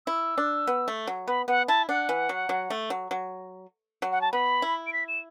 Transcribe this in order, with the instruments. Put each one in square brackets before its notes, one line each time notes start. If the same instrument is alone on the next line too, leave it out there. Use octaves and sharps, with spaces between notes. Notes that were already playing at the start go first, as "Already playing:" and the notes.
[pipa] E4 [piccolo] E6
[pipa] D4
B3
A3
F#3
[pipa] B3 [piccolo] B5
[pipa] B3 [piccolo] F#5
[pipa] E4 [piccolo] A5
[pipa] D4 [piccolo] F#5
[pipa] E3
F#3
F#3
A3
F#3
F#3
F#3
[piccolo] F#5
A5
[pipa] B3 [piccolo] B5
[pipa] E4
[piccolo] D7
B6
E7